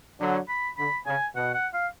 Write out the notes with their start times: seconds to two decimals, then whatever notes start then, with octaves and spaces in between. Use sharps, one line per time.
0.20 D3 F#3
0.48 B5
0.77 D3 B5
1.06 C#3 G#5
1.35 B2 F#5
1.54 F#5
1.73 F5